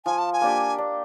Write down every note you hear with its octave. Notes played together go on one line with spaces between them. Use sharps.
F3 G#5
A5
G#5
A#3 D4 G4
D4